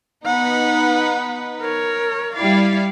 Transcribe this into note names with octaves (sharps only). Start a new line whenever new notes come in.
B3 D#4 B4 F#5
A#4 C#5
G3 E4 D5 F5